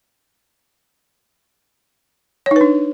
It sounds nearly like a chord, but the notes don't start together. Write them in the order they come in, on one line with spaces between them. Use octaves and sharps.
C#5 D#4 B4 D4